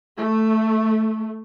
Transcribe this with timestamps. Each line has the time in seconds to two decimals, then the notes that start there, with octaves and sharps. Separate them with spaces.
0.17 A3